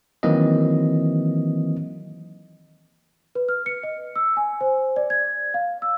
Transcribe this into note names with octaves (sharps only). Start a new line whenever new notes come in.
D#3 E3 F#3 A#3 C4 D#5
B4
F6
C#7
D#5
E6
G#5
C5
D5
G#6
F5
E6